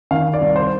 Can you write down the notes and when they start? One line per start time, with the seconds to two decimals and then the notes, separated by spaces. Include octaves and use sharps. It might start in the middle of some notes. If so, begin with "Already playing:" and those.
0.11 D#3 F5
0.34 D5
0.40 C2
0.56 C5